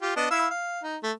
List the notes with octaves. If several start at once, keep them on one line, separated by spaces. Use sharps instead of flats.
F4 G4
B3 D4 D#5
E4 F5 E6
F5
D#4
A3